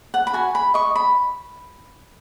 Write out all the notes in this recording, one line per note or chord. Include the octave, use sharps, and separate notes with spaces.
F#5
B5
F#4 G#5
B5
D#5 C#6
B5